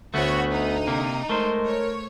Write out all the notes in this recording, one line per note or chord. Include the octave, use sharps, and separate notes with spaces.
D2 D3 A3 B3 F#4 C#5
D#4
C3 A#3
G#3 A3 A#4 C5
C#5